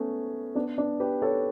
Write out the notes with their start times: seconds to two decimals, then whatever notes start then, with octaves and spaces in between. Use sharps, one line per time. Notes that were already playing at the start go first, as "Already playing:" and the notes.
Already playing: A3 B3 C#4
0.55 B3 D4
0.78 B3 D4
1.00 G4 B4
1.22 A4 C#5